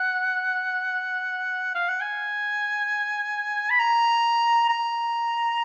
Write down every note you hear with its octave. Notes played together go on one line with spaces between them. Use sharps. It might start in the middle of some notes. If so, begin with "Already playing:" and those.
Already playing: F#5
F5
F#5
G#5
B5
A#5
A#5